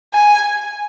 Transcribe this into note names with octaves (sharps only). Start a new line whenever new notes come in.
G#5